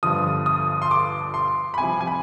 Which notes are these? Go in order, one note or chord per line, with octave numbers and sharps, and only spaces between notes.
G1 G2 D3 F3 D#6
D#6
C6
D6
C6
B5
C2 C3 F3 G#5
G#5
B5